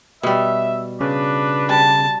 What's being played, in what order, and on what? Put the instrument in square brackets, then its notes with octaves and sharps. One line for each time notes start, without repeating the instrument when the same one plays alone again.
[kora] B2 G3 [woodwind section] E5
[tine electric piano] C#3 [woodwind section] D4 B4
[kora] G3 [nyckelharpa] A5